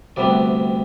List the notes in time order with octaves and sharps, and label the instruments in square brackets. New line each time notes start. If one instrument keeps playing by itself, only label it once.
[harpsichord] D2 C3 G3 B3 D5